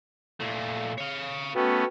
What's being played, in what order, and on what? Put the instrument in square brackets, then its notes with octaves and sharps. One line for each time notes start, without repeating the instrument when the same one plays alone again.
[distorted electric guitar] A#2 A3
C#5 F5
[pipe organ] A3 B3 C#4 [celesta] F#4 B4 G5